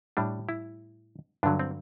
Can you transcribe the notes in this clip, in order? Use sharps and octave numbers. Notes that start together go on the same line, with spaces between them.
A2 G3 D4
E4
G2 D3 F#3 D4
C4